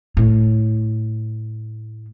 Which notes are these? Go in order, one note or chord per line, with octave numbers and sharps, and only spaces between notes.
A2